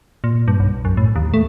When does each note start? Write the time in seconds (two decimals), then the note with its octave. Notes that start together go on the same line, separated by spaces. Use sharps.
0.24 A#2
0.48 G2
0.60 B1
0.85 F#2
0.97 A2
1.16 D#2
1.34 A3